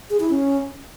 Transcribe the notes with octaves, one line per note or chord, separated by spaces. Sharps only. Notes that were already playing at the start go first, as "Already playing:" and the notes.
G#4
E4
C#4